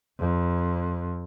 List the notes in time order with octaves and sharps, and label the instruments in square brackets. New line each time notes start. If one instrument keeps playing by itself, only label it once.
[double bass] F2